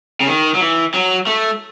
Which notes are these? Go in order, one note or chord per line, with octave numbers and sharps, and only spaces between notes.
C#3
D#3
F#3
E3
F#3
A3